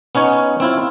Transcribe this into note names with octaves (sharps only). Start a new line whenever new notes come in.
B3 C#4 D#4 C#5
C4 E4 F4